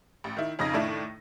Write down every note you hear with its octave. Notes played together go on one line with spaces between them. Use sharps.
A1
D#3 E4
F2 C#3 D#4 A#6
A2 D#3 D4 E4